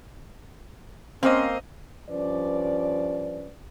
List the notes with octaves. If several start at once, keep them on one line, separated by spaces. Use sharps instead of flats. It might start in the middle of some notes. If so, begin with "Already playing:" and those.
A#3 C4 C#4 C5 D#5 F5
G2 F3 C#4 B4 D5